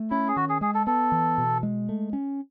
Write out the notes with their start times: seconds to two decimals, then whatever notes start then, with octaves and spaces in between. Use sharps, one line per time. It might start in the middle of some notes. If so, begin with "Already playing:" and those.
Already playing: A3
0.10 C#4 E4
0.28 G#4
0.36 D#3 F#4
0.49 G#4
0.61 G#3 G#4
0.74 A4
0.87 B3 A4
1.12 E3
1.38 B2
1.63 G#3
1.89 A3
2.13 C#4